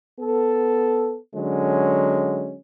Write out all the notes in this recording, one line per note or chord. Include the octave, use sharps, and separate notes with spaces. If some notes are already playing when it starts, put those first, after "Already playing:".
B3 A4
D3 F#3 G#3 C#4